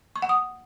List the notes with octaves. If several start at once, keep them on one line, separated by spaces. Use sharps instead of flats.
C#6
F#5
D#6